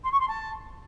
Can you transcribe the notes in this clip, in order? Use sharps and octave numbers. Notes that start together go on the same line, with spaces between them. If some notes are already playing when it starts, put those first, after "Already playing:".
C6
C#6
C6
A5